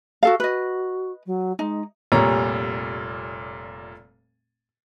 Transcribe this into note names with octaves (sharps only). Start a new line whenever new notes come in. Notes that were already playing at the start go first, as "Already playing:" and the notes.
F#4 A4 F5
F#4 B4 D#5
F#3
G#3 D#4
F1 A#2 G3 C#5 A#5